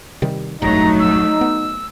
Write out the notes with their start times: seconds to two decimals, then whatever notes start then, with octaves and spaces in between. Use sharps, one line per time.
0.22 C3 D#3 G3
0.62 F1 A#1 G2 F#3 A3 D#4 A#5
1.00 E6
1.41 B3